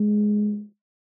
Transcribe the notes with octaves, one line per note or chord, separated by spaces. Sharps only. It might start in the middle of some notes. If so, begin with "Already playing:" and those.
Already playing: G#3